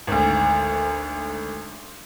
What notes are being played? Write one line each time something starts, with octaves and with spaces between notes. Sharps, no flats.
G#1 D2